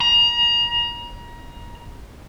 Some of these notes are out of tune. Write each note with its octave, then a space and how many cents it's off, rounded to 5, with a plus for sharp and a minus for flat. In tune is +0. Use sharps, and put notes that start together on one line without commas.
A#5 +30